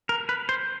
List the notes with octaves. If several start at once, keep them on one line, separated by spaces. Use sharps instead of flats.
A#4
B4
C5